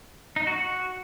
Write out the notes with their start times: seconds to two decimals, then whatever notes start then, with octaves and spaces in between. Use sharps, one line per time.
0.36 D#4
0.47 F#4
0.57 F#4